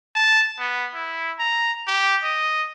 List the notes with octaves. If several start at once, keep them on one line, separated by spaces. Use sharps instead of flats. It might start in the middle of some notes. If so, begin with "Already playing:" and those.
A5
B3
E4
A#5
G4
D#5